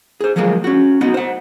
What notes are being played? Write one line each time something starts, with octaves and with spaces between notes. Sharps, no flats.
G#4 C5
F3 F#3 G#3 A#3 G#4
C#4 F#4
B3 D#4 F#4
C5 F#5